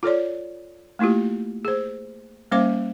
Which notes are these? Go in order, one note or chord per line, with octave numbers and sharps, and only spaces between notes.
F4 A4 C#5 D5
A3 A#3 E4 F4 G4
G#4 C5
G3 A#3 C#4 C5 F5 D6